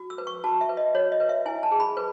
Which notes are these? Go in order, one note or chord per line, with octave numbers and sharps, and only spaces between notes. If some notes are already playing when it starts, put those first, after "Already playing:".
Already playing: F#4
E6
B4
C#6
F#4 A5
E5
B4
D#5
F#4 C#5
D#5
B4
E5
E4 G#5
A5
G#4
B5
B4